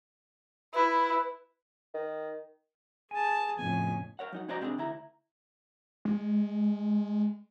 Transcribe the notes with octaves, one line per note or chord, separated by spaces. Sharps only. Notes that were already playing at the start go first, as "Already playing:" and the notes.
E4 B4
D#3
G#4 G#5 A5
F2 A2 C#3 B3 G#5
A#4 C#5 F#5
F#3 D#4 F#5
C#4 F#4 C5 D5 D#5 A#5
C2 G3 C4 D4 G#4
D2 E4 A#5
G#3